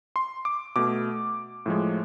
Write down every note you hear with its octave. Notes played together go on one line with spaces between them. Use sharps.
C6
D6
B2 A3 D6
A2 F3 G#3